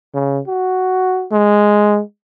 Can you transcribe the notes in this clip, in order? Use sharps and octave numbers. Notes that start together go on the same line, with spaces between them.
C#3
F#4
G#3